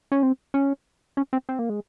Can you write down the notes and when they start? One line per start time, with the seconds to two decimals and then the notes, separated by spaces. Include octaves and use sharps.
0.12 C#4
0.23 C4
0.54 C#4
1.17 C#4
1.33 C4
1.49 C4
1.59 A#3
1.69 G#3